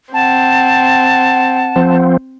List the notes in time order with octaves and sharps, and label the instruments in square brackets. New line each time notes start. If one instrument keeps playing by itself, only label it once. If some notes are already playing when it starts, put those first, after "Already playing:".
[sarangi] C4 [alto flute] F#5 [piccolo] A5
[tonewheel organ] F3 C4